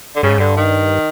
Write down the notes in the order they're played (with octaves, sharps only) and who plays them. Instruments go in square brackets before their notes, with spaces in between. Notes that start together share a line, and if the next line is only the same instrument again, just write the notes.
[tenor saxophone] D3
[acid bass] G2 [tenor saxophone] C#3
[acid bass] G#2
[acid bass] G2 [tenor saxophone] D3
[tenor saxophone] D#3